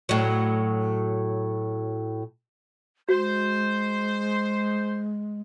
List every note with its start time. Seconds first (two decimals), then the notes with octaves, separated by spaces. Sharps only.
0.09 A2 F#3
3.09 G#3 F#4 C5